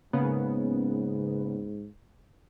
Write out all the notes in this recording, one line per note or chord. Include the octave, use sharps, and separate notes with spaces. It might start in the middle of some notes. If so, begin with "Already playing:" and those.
G#2 C#3 A#3 B3